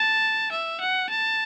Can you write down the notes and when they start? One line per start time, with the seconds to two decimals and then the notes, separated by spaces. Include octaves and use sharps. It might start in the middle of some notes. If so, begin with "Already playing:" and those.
Already playing: A5
0.51 E5
0.80 F#5
1.09 A5